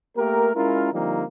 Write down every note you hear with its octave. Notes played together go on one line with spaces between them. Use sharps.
A3 A#3 G4 A#4
G#3 C#4 E4 F4 A#4
D3 F3 G3 A#3 C4 D#4